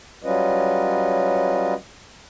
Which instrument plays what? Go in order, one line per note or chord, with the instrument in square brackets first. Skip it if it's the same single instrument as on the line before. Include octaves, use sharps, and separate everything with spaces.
[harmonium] F#3 G3 C#4 F4 B4 D#5